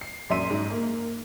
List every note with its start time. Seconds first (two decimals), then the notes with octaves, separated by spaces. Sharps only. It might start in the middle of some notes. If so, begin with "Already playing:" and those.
0.01 C7
0.29 A#1 F#2 E5 C6 D#7
0.50 G#2
0.71 A#3